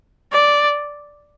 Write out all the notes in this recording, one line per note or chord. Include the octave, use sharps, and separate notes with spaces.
D5